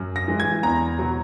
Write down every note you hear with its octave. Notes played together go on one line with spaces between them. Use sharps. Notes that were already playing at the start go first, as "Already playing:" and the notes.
Already playing: F#2
A#6
E3 G#3
G#6
E2 A#5
B2 F#3